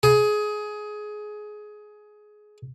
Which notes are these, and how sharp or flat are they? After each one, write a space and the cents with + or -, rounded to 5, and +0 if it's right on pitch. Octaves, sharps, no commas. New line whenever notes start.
G#4 +20